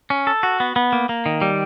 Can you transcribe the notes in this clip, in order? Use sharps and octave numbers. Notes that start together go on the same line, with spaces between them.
C#4
A4
F#4
B3
B3
A#3
A#3
D#3
G3